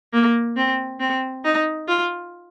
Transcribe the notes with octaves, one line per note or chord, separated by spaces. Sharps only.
A#3
C4
C4
D#4
F4